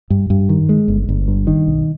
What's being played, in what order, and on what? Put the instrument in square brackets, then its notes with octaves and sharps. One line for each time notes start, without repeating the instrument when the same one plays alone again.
[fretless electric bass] G2
G2
D#3
G#3
G1
G1
G2
D#3
B1